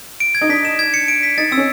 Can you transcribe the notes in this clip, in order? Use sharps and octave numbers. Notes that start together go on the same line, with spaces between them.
D7
G#6
D#4
D4 B6
E7
G#6
C#7
D7
B6
D#4 A6
C4 E6
C#4